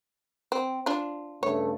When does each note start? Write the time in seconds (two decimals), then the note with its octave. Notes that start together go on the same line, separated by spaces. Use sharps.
0.52 C4
0.86 D4 F4
1.43 G2 C#3 A3 C#5